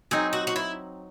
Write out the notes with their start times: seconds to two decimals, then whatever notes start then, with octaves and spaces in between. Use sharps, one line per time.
0.11 F#3 C4 D#4 G#4
0.33 F#4
0.47 F#4
0.56 E4